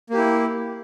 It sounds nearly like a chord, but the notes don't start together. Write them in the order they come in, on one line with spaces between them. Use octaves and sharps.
A#3 G4 E4